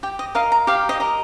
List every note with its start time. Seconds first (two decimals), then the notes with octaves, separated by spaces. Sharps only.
0.03 G4 G5
0.19 D#5
0.35 A#4 D#5 F5
0.52 A#5
0.67 G4 F5
0.89 D#5
1.00 A#4 D#5